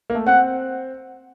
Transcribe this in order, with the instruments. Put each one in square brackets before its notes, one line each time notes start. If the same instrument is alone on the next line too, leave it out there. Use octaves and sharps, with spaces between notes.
[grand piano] A#3
A3
[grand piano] C4 [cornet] F#5